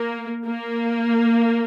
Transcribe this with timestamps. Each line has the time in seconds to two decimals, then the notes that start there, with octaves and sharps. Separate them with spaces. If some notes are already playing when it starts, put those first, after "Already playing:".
Already playing: A#3
0.46 A#3